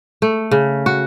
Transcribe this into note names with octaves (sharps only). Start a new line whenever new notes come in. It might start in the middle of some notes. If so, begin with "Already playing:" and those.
A3
C#3
F#4